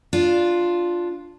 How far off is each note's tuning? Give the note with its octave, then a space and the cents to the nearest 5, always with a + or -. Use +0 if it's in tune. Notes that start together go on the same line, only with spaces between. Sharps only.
D4 +0 F4 +0